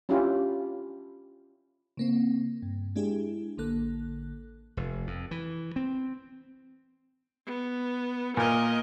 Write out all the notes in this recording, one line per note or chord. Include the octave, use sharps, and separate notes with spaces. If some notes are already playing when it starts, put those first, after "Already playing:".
C#4 D4 E4 F4 G4
C#3 A#3 C4
G2
G#3 D4 E4 G4 G#4
A1 D3 A#3 A4 F#6
F1
F2
E3
C4
B3
A#2 A#4 D#5